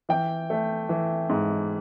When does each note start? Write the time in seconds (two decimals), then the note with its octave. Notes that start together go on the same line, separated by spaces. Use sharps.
0.09 E3 G5
0.50 A3
0.89 E3
1.29 G#2